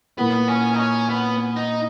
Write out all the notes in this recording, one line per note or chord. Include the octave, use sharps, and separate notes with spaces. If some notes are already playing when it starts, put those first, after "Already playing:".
A#2 A#3 B3 E4
C#4
D#4
C#4
B3
D#4